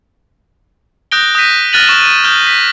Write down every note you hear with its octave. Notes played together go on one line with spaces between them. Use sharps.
D#6 F#6 G6 A#6 D7 G7
D#6 F#6 G6 A#6 B6 D#7
F6 F#6 A6 A#6 D#7 F#7
C#6 F6 F#6 D#7 E7 G7
D#6 F6 G6 G7
B6